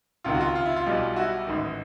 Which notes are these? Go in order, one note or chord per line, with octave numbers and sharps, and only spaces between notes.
C#2 C3 D#3 F4
F#4
F4
F4
E4
F4
B1 B2 G3
E4 F#4
A1 G#2 D#3